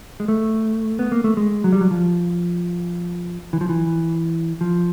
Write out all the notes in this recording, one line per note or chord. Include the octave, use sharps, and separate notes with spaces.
G#3
A3
B3
A#3
A3
G#3
F#3
G3
F#3
F3
E3
F3
E3
F3